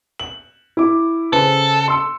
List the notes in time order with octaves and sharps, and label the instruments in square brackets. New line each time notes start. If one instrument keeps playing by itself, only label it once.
[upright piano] F#7
E4 D6
[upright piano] C#3 B4 C5 [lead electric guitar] A4
[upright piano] C6 E6 C#7